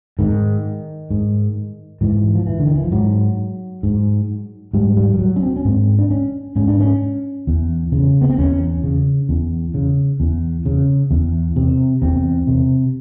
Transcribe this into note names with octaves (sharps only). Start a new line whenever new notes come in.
G#2 D#3
G#2
G#2 E3
F3
E3
D3
D#3
E3
F3
G#2 F#3
G#2
G#2 G3
G3
G3
F#3
C#4
C4
C#4
G#2 C4
D4
C#4
G#2 C#4
D4
C#4
E2
C#3
B3
C4
E2 C#4
C#3
E2
C#3
E2
C#3
E2
C3
E2 C4
C3